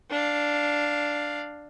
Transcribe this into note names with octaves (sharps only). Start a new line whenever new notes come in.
D4 F5